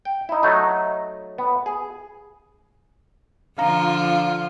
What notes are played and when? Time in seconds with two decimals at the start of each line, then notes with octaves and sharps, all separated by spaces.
0.05 G5
0.29 D#4 E4
0.43 F#3 A3 D#4
1.38 B3
1.66 G#4
3.58 D3 F3 F4 F5 A#5